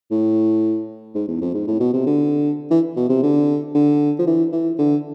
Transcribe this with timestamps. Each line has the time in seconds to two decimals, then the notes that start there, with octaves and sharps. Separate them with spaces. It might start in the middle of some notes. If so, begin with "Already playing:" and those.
0.11 A2
1.15 G#2
1.28 E2
1.41 F2
1.54 G#2
1.68 A2
1.80 B2
1.93 C3
2.07 D3
2.71 E3
2.97 B2
3.09 C3
3.23 D3
3.75 D3
4.19 F3
4.27 E3
4.52 E3
4.79 D3